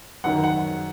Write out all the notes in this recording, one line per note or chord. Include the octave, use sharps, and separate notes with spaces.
F#2 D#3 F#5
F#5